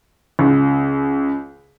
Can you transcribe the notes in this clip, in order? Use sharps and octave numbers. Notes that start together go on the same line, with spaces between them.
C#2